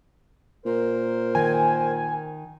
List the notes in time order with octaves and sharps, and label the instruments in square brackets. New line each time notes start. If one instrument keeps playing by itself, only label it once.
[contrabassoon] A#2 [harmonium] A#4 C5
[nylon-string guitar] D#3 [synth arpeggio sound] G#5